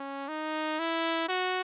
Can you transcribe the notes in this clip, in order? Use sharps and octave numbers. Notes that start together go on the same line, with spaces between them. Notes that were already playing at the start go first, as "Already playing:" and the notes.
Already playing: C#4
D#4
E4
F#4